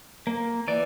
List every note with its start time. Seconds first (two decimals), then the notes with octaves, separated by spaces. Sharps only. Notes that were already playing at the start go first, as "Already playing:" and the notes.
0.27 A#3
0.68 E3 D5